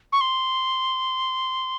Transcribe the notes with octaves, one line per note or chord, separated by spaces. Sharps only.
C#6
C6